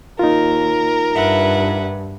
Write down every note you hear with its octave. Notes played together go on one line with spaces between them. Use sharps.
D#2 D#4 F4 A#4
G2 B4 E5 F#5